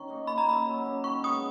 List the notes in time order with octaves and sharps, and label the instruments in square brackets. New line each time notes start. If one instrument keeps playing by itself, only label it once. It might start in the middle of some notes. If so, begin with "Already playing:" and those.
Already playing: [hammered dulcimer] D#3 C#4 [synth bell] C#6
[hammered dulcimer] A#3 D#4
[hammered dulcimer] A#2 [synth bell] B5
[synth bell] A#5
[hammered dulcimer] A#3 C#4 E4 [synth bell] B5
[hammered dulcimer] F#3
A#3 C#4 F#4
[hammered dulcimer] D#3 [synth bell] C#6
[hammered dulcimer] G#3 B3 [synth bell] D#6